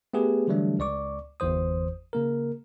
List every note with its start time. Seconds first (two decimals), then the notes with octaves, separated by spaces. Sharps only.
0.14 A3 B3 G4 G#4 B4
0.48 D3 E3 F#3 G3 A3 D4
0.79 C#2 D5 C#6 D6
1.40 G1 E2 E3 C5 D#6
2.13 C#3 A#3 A#4